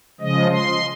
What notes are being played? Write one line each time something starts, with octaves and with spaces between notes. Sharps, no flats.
C#3 F3 G#3 D#5
C6